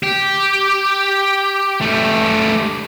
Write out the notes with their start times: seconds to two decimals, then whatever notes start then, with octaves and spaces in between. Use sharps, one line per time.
0.03 G4
1.81 A3 G4